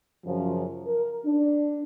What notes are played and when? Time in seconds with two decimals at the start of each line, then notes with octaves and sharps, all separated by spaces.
0.25 F#2 C#3 F3
0.86 A#4
1.24 D4